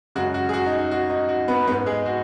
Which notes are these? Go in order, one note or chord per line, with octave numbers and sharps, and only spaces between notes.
F#2 C#3 G#3 F#4
F#4
G#4
F#4
D#4
D#4
F#4
D#4
F#4
B3 B4
G#2 G#3 B3 B4
G#3 G#4
F#4